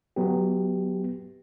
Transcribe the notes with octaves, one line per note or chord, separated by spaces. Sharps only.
F#3 B3 G4